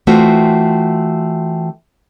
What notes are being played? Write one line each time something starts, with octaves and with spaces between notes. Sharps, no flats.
E3 A3 C4 F4 F#4